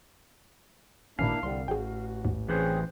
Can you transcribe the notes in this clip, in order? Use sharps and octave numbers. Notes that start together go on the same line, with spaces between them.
A1 A#2 D#3 A#3 C#4 D4 E4 F5
C2 D3 G3 C6
A1 F#4 G#4 G5
D#2 G#2
E3 C4 C#4 G#4 B4 C5